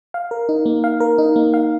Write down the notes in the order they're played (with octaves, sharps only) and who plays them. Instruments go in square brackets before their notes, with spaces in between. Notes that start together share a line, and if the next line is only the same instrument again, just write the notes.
[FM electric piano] F5
A#4
D#4
A#3
F5
A#4
D#4
A#3
F5